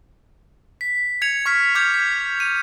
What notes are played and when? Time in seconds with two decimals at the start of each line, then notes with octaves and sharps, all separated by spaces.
0.81 B6
1.22 G#6 C#7 F7
1.46 C#6 F6 B6
1.75 D6 F6 G6 G#6
1.94 B6
2.40 D#7